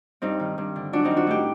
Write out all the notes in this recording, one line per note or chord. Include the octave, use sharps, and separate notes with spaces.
G2 C4 D#4
D#3
G2
D3
F#2 D4 F#4
C4 D#4
D#3
D4 F#4
A2 D#4 G4